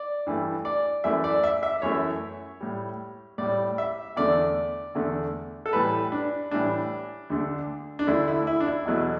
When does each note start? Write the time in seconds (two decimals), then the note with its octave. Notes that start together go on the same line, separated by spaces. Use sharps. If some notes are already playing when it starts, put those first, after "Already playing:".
Already playing: D5
0.26 G2 E3 A3
0.65 D5
1.04 F#2 E3 A3 E5
1.24 D5
1.44 E5
1.63 E5
1.82 F#2 E3 A3 C#5
2.61 A2 G3
3.38 A2 G3 D5
3.78 E5
4.16 E2 D3 A3 D5
4.95 E2 D3 A3
5.66 A4
5.73 A2 E3 G3 B4
6.12 D4
6.51 A2 E3 G3 D4
7.30 D2 D3 A3
7.99 D4
8.07 D2 D3 A3 E4
8.28 E4
8.47 E4
8.60 D4
8.66 E4
8.85 E2 B2 F#3 A3